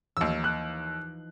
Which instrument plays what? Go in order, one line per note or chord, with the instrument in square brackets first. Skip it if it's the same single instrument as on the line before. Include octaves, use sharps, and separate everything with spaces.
[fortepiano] D#2 E6 [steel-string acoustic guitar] E3 F3 D#4
[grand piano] F#6